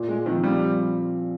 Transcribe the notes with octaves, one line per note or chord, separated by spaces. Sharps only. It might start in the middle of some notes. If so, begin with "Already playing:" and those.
Already playing: A#2
G#3
D#3 F3 C4
G3